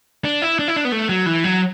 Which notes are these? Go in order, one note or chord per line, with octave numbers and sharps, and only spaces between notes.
D4
E4
D4
E4
D4
B3
A3
F#3
E3
F#3